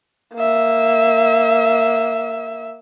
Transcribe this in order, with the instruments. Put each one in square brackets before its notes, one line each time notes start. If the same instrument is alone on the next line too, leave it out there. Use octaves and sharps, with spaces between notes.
[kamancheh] A#3 E5